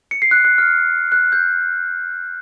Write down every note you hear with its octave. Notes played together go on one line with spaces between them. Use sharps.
C#7
C7
F#6
F#6
F6
F#6
G6